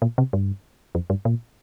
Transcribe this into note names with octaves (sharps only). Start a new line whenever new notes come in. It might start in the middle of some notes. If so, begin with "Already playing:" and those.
A#2
C3
G2
F2
G2
A#2